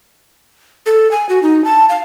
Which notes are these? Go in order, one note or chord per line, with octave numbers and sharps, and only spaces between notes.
A4
G#5
F#4
D#4
A5
F5